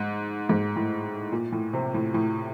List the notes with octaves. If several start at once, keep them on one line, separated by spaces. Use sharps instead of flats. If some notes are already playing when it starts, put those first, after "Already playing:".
Already playing: G#2
G#2
A2
A#2
A2
C3
A2
A2